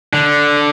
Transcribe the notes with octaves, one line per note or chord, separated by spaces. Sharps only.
D3